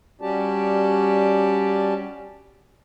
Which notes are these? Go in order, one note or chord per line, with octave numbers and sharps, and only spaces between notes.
G3 C#4 F#4 G4 D5 A5